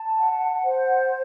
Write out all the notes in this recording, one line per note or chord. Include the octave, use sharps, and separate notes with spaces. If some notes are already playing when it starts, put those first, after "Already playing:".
Already playing: A5
F#5
C5